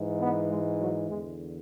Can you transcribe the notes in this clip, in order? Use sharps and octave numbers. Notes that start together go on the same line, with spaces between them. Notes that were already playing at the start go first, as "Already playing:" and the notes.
Already playing: G#2 E3
B3
G#3
F#3
E2 D3 G#3